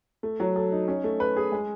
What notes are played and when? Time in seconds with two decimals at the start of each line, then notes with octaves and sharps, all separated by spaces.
0.23 A3
0.40 F#3
0.56 A4
0.72 D#4
0.88 C#4
1.04 A3
1.20 B4
1.37 G#4
1.52 G#3